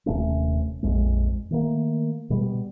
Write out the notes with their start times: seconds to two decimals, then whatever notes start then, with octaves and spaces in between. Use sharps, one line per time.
0.06 D#1 C3 A3 C#4
0.83 A#1 F2 G#3
1.51 D#3 A3 A#3
2.30 B2 G3